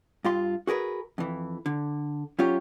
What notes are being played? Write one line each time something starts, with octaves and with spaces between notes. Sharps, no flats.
G2 F4 C6
F#4 G#4 A#4 B4
F2 E3
D3
F#3 C#4 F4 G4 C#5